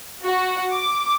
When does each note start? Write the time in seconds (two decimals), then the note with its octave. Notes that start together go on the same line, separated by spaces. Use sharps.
0.24 F#4
0.72 D6